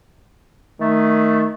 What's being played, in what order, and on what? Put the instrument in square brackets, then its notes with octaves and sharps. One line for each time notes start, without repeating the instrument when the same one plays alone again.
[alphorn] D#3 [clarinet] A3